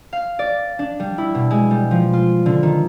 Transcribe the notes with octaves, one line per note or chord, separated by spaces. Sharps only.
F5
D5
D4
G3
E4
B2
G#3
G3
F3
F4
D3
D#3